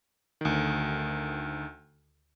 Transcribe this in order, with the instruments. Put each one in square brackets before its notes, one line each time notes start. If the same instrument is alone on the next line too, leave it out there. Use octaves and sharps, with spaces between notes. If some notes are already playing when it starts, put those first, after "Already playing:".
[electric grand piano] D2 D#3